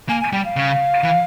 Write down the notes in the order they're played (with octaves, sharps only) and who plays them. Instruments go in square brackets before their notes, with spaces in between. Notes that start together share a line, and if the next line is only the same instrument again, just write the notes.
[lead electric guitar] A#3 [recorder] G#5
[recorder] G#5
[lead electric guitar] G3 [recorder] G5
[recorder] F5
[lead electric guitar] C#3
E3